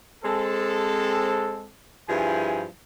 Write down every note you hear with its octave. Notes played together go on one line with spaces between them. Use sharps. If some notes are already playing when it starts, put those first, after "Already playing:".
G#3 C4 A4
G2 F3 E4 G#4 G#5